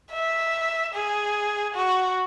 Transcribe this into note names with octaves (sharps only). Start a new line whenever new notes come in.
E5
G#4
F#4